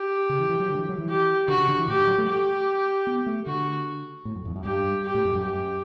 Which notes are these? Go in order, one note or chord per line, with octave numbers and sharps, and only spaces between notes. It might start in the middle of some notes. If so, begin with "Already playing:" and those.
Already playing: G4
C#3
E3
E3
F#3
D3
F#3
E3
F#3
E3
G4
D3 F#4
C#3
D3
E3
A2 G4
G2
F#3
A3
G4
B3
A3
D3 F#4
A2
F#2
E2
F#2
G2 G4
G4
A2
F#2
F#2
G4